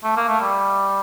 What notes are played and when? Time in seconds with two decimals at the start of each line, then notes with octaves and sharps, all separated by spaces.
0.04 A3
0.17 A#3
0.28 A3
0.40 G3